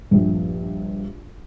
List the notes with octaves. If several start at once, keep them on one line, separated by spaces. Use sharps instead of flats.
A#1 G2